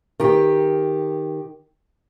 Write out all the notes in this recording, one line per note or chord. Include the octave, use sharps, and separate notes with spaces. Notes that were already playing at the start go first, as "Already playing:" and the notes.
D#3 G4